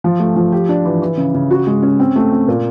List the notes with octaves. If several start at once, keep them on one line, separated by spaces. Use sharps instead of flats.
F3
A3
F3
G4
D4
E3
E3
C#3
C#3
F#4
G#3
C#4
C4
A3
C4
A#2